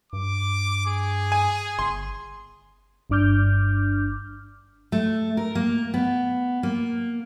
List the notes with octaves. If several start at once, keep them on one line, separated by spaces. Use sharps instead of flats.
G2 D6
G#4
G#5
G1 C6
G1 G2 D4 D6 F6 G6
A3
A#4
A#3
B3
A#3